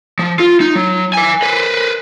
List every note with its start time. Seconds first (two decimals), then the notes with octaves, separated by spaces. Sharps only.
0.19 F3
0.39 F4
0.61 D#4
0.75 F#3
1.14 B4 G#5
1.42 B4 C5